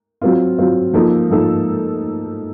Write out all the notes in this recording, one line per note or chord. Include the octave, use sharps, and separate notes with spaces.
F#3 C4 F4
F#3 C4 F4
F3 A#3 D#4 A4
F3 A#3 D#4 A4